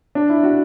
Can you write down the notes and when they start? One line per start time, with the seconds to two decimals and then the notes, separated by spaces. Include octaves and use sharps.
0.15 D4
0.30 E4
0.43 F#4